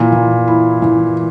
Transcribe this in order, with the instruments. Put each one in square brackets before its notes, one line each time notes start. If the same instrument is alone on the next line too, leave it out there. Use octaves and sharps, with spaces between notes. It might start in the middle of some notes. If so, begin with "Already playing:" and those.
Already playing: [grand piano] A#2 [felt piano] E3
[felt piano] E3
E4
E3